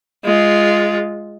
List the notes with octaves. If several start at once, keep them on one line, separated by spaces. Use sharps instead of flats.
G#3 F4